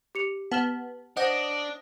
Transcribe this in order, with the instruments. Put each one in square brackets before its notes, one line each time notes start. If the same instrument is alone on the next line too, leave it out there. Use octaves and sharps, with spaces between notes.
[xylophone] G4 C#7 F7
[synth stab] B3 [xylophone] A5 F6 E7
[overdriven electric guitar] D4 [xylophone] C5 F#5 [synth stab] D#5